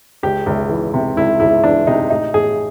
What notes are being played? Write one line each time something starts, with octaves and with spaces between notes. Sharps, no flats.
C#2 G4
C#2
E3
C3
C#2 E4
C#2 E4
E3 D4
C3 D#4
A1 D#4
A1 G#4